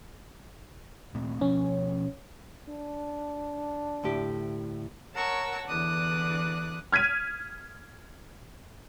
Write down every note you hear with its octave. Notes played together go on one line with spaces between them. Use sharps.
A#2 A3 C4
B2 F3 C#4
D4
D2 A2 G4
A#4 C#5 F#5 A5 C#6 E6
E2 D3 E3 D6 D#6 F#6
F6 G#6 B6 D#7